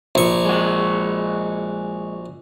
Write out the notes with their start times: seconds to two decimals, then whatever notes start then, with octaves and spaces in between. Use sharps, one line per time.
0.15 A#1 C#6
0.45 G#3 F#4